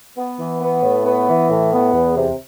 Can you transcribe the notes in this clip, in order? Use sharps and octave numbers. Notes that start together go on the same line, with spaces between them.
B3
E3
B3
A2
B3
E3
A2
B3
E2
C3